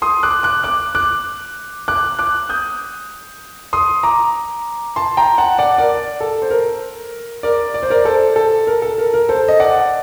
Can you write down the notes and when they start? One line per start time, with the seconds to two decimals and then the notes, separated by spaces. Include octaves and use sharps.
0.02 C6 D#6
0.23 D6 F#6
0.43 D6 F#6
0.64 D6 F#6
0.95 D6 F#6
1.88 D6 F#6
2.19 D6 F#6
2.49 D#6 G6
3.73 C6 D#6
4.03 A#5 D6
4.96 A5 C6
5.17 G5 A#5
5.38 F#5 A5
5.59 D5 F#5
5.78 A#4 D5
6.21 A4
6.42 C5
6.51 A#4
7.43 A#4 D5
7.74 D5
7.83 C5
7.90 A#4 D5
8.05 A4 C5
8.36 A4
8.67 A#4
8.82 A4
8.98 A#4
9.14 A#4
9.29 A4 C5
9.48 D#5
9.60 D5 F#5